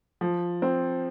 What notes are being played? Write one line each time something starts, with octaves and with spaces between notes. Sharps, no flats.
F3
C4